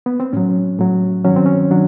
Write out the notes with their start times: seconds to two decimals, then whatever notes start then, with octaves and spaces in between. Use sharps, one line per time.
0.06 B3
0.20 C4
0.33 A2 F#3 C#4
0.79 A2 F#3
1.25 G2 D#3 F#3 C#4
1.36 C4
1.46 C#4
1.71 D#3 F#3 D4